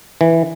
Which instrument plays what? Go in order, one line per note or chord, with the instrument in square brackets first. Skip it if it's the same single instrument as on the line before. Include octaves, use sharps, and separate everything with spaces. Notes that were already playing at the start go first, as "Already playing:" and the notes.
[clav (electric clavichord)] E3